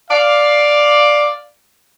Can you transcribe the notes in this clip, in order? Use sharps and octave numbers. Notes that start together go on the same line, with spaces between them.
D5 F5